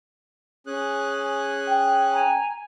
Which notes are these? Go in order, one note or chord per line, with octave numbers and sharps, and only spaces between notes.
C#4 G#4 F#6
G5
G#5 A#5